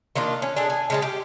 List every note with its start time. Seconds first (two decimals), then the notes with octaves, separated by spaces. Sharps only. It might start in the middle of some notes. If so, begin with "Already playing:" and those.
0.16 D#3 A#3 D4 F4
0.42 C#4
0.57 D4 G#4 A4
0.70 G#5
0.90 C#3 G#3 A5
1.02 G4